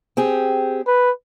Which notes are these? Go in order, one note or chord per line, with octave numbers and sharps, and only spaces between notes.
C4 G4 G#4
B4